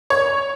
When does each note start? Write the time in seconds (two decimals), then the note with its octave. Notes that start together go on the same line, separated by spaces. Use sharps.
0.10 C#5